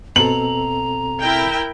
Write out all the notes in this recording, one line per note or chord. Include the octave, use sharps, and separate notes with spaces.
B2 C4 A4 A#5 F#7
E4 A#4 G5